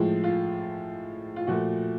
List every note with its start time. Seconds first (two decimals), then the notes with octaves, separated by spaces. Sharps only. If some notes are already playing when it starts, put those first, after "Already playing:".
Already playing: A2 F3 G#3
0.24 F4
1.36 F4
1.47 A#2 F3 A3 F#4